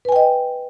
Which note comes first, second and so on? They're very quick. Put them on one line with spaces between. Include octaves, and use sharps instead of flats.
B4 G#5 G5 D#5